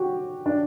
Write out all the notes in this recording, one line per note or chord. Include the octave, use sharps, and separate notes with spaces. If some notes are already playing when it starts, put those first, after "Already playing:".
Already playing: F#4 G4
D4